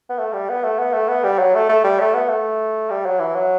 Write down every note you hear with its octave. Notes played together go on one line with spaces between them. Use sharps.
B3
A3
G3
B3
A3
B3
A3
B3
G3
F#3
A3
A3
G3
A3
B3
A3
G3
F#3
E3
F#3